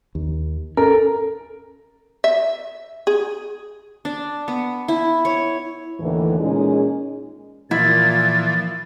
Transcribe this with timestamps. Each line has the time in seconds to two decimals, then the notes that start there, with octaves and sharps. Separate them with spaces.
0.15 D#2
0.77 C#4 A4 A#4
2.24 E5
3.07 G#4
4.05 D4
4.48 B3
4.88 E4
5.25 C#5
6.00 D#2 A2 D3 E3
6.40 A#2 G#3 C#4 D#4 G#4
7.71 A#2 E3 F3 E4 A6